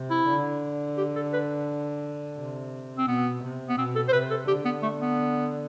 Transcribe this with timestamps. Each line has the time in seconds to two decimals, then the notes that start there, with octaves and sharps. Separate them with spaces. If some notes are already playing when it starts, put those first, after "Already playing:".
Already playing: C3
0.10 E4
0.28 D3
0.98 G4
1.15 A4
1.33 B4
2.38 C3
2.98 C4
3.08 B2 B3
3.43 C3
3.69 B3
3.78 B2 C4
3.96 A4
4.08 C5
4.13 C3 B4
4.30 A4
4.48 D3 G4
4.65 B3
4.82 A3
5.00 B3